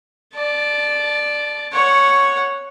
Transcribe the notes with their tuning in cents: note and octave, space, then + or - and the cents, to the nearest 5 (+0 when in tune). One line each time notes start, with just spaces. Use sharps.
D5 +5 A5 -15
C#5 +0 F#5 -10